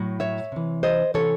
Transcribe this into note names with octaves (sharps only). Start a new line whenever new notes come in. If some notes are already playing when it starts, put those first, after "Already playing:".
Already playing: A2 F#3
C#5 E5
C3 E3
C5 D#5
C3 E3 A4 C#5